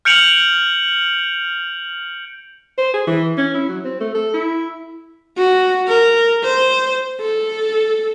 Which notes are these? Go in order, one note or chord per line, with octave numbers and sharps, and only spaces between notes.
F6 G6 C#7 D7 F7 F#7
C5
G#4
E3
C#4
E4
F#3
C4
A3
A4
E4
F#4
A#4
C5
A4